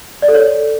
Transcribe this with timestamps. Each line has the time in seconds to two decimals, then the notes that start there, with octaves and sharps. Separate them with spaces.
0.22 D5
0.28 A4
0.34 C#5